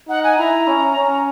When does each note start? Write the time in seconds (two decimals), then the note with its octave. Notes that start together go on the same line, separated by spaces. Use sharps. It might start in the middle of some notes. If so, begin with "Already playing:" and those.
0.09 D#4 F#5
0.24 G#5
0.38 E4 A#5
0.68 C#4
0.97 C#4